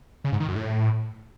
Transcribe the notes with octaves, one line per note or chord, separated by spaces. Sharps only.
C#3
G#2
D#3
F#2
A2